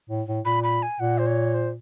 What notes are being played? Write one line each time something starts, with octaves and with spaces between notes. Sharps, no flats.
A2
A2
A#2 B5
B5
G#5
A#2 F#5
C5
C#5
C5